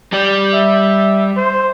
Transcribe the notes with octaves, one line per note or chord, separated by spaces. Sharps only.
G3 G4 D5
E5
C5